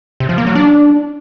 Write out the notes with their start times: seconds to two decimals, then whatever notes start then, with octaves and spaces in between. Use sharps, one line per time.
0.20 C3
0.29 F3
0.38 A#3
0.47 F#3
0.55 D4